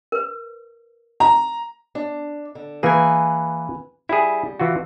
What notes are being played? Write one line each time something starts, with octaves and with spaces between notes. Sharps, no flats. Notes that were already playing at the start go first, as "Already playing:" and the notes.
A#4 B4
A#5
D4
D3
E3 A#3 G#4 B4 G#5
G3 E4 G#4
E3 F4 F#4